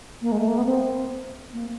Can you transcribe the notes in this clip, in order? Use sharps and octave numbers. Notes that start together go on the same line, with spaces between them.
A#3
G#3
A3
A#3
B3
C4
A#3